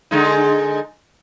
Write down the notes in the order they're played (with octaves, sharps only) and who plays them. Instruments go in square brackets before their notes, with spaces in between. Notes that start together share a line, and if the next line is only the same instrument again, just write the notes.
[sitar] D3 G#3 D#4